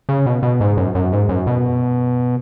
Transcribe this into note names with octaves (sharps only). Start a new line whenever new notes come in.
C#3
B2
B2
G#2
F#2
F#2
G#2
F#2
B2